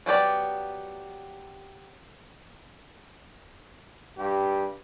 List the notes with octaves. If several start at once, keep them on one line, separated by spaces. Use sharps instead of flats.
F#3 B3 G4 D5
G2 G4